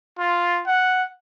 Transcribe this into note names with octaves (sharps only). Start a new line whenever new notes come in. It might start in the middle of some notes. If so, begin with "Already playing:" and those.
F4
F#5